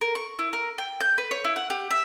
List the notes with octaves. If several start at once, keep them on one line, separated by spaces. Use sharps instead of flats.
A#4
C#6
E4
A#4
G5
G6
B4
C#5
E4
F#5
G4
E5